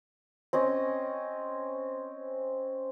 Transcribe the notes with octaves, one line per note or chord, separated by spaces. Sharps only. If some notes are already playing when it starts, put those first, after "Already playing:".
C4 C#4 D#5